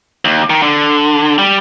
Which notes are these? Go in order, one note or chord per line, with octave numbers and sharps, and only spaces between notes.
D#2
D#3
D3
G3